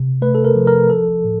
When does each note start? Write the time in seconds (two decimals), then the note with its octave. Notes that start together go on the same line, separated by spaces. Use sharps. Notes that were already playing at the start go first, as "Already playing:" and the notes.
Already playing: C3
0.22 A3 B4
0.35 A4
0.45 A#4
0.55 F3
0.67 A#4
0.90 F3 A4
1.24 A2